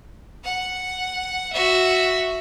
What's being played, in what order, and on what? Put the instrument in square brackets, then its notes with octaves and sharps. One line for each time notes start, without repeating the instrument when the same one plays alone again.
[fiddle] F#5
F#4 E5